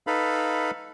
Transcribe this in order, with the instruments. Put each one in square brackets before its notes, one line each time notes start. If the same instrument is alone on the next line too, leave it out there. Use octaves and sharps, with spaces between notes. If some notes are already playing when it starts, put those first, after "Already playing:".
[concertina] D#4 A4 B4 F5 B5